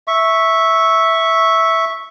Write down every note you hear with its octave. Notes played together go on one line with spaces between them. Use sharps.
E5 C#6